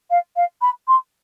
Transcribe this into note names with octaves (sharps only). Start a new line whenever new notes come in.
F5
F5
B5
C6